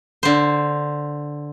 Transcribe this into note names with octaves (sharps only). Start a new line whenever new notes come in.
D3 C5